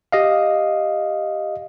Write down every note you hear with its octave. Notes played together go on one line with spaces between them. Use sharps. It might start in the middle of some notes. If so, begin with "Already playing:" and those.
G4 D#5 F5